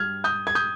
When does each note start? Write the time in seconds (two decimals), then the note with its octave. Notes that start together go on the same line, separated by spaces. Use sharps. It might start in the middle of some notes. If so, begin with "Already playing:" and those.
Already playing: G2 G3 F6 G#6
0.24 D#6 G6
0.47 G#6
0.55 D#6 G6